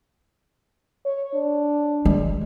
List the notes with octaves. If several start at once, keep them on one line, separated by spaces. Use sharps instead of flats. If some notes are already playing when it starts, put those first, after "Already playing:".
C#5
D4
G#3